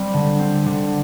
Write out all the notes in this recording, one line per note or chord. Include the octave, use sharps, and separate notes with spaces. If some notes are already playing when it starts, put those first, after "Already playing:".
Already playing: G3 C4
D3
C4
D3